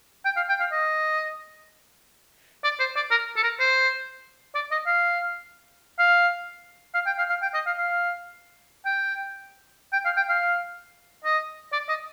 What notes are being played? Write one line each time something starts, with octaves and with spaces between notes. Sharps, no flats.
G5
F5
G5
F5
D#5
D5
C5
D5
A#4
A4
A#4
C5
D5
D#5
F5
F5
F5
G5
F5
F5
G5
D#5
F5
F5
G5
G5
F5
G5
F5
D#5
D5
D#5